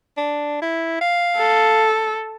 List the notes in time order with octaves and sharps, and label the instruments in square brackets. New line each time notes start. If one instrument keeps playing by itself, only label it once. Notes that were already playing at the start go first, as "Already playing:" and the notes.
[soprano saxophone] D4
E4
F5
[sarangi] A4